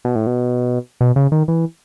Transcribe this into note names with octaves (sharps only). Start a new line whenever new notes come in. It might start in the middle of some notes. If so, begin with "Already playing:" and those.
B2
A2
B2
B2
C#3
D#3
E3